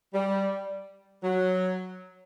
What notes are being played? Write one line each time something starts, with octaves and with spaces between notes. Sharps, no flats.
G3
F#3